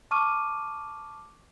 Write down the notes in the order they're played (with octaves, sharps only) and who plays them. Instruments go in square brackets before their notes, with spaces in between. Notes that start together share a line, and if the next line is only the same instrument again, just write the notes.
[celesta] A5 C#6 D6 F6 D#7